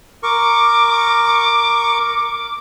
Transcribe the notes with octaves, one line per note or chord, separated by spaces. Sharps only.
A#4 C#6 D6